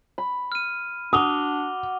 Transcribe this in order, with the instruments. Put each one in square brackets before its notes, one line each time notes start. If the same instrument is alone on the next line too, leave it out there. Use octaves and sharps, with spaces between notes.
[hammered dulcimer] B5
[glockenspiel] F6 D#7
[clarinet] D4 [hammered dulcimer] F#4 [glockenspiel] D6 F7 G7 [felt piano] D#6